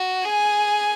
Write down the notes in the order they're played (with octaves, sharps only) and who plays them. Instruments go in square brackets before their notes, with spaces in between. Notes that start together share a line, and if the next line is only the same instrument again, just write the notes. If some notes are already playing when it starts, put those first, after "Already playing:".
Already playing: [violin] F#4
[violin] G#4 [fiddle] G#5